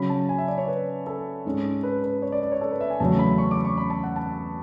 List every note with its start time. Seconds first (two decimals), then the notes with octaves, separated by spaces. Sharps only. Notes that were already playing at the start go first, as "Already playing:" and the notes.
Already playing: C#3 F#3 C#4 B5
0.09 A5
0.29 G#5
0.38 E5
0.48 D5
0.58 C#5
0.68 B4
1.07 A4
1.45 G#2 G#3 C#4
1.83 B4
2.04 B4
2.22 C#5
2.32 D5
2.42 D5
2.52 C#5
2.61 A4
2.71 B4
2.81 E5
2.90 G#5
3.00 E2 C#3 F#3 A3 C#4 A5
3.19 B5
3.38 C#6
3.51 D6
3.65 C#6
3.78 B5
3.90 A5
4.03 F#5
4.16 A5